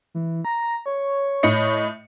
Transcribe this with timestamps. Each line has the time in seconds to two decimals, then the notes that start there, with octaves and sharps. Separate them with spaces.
0.15 E3
0.45 A#5
0.86 C#5
1.43 A2 D#5 C#7